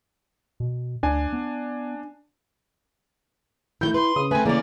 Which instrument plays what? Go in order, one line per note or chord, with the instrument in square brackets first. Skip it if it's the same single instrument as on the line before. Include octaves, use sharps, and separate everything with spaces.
[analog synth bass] B2
[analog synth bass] D2 [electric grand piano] D4 G#5
[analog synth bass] B3
[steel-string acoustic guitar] D#3 F#3 A3 [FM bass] E4 [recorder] G6
[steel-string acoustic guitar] B4 [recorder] C6
[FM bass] C#3 [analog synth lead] D#6
[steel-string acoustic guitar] A3 C4 [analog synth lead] B4 [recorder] G#5
[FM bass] C#3 [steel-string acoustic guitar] E3 A3 C#4 [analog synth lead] A#3 [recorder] D5